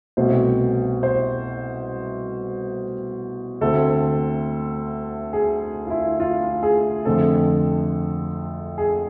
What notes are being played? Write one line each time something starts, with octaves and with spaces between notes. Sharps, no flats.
C2 B2 A3 C4 C5
C5
D2 D3 A3 C4 A4
G#4
F4
E4
F4
G#4
F2 D3 A3 C4 A4
G#4